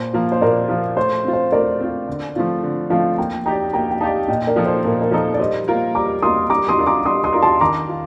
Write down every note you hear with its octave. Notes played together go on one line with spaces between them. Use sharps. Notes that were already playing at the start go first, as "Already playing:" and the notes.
Already playing: A#2 C5
F3 A#3 F4
C5
A#2 A#4 D5
F3 A#3 F4
A3 C5
C4 F4
C5
A3 A#4 D5
C4 F4
D3
F3 A3 C4 F4
D3
F3 A3 C4 F4 F5 A5
A#3 G5 A#5
D#4 G4 D5 G5 A#5
A#3 G5 A#5
G5
D#4 G4 D5 F5 A5
A#2 D#5 G5
A#4 D5
F3 A#3 D#4 A4
C5
A#2 A#4
A#4
F3 A#3 D#4 A4 C5
D5
G3 C5 D#5
A#3 F4 A#4
G3 A#5 D6
A#3 F4 A#4 C6 D#6
G3 A#5 D6
C6 D#6
D4 F4 A#4
A#5 D6
G3 C6 D#6
C6 D#6
D4 F4 A#4
A5 C6
D#3 A#5 D6
F4